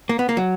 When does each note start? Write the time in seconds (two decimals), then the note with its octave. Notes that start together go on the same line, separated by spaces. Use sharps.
0.09 A#3
0.19 B3
0.29 A#3
0.37 F#3